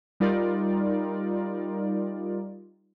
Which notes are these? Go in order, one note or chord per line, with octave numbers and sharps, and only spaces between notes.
G3 D#4 F4 A#4 D5